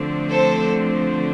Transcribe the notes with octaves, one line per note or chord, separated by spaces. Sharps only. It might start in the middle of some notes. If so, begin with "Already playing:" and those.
Already playing: D3 F3 A3 C4
A4 C5